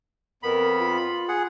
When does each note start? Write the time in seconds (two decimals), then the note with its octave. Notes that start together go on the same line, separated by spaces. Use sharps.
0.43 F2 B3 A#4 B5
0.79 F4
1.28 G#4 F#5